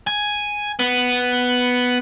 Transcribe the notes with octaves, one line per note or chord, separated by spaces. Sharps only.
G#5
B3